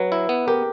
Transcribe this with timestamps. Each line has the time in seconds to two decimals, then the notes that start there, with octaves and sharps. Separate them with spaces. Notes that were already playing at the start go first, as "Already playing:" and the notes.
Already playing: F#3 B4
0.12 E4
0.29 B3
0.47 G4 A#4